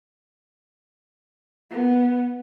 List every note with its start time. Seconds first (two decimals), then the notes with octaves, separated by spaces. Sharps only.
1.71 B3